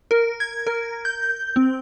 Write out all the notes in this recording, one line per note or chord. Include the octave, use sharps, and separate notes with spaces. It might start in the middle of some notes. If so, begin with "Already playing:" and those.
A#4
G#6
A#4
G6
C4